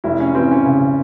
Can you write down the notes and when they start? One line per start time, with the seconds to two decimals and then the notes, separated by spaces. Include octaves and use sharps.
0.04 F1 E4
0.20 C#4
0.35 E3 C4
0.51 C#4
0.66 C#3